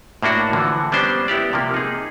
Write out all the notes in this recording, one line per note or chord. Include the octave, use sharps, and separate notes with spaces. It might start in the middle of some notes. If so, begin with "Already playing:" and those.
A2 A#3 D4 F#4
D3 E3 F3
G3 B3 C#4 D4 C5
B3 E4 G4 D5
C3 F3 A#3
D#4 G#4